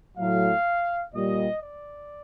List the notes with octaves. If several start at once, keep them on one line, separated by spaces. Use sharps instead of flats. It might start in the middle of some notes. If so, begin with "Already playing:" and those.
A2 F#3 F5
A#2 G3 D#5
D5